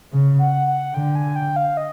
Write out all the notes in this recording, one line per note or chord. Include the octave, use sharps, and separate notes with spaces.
C#3
F#5
F#5
D3 G5
G#5
G5
F5
D#5